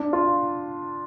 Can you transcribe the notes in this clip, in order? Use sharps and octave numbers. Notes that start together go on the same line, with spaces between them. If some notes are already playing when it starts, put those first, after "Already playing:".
Already playing: D4
F4